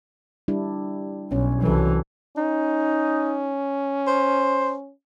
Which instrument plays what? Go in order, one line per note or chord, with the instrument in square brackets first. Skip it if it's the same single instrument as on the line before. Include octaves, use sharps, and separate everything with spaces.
[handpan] G3 D4 E4
[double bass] B1 [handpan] C#4
[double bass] C2 E3 [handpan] F#3 A4
[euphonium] C#4 [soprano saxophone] D#4
[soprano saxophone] C5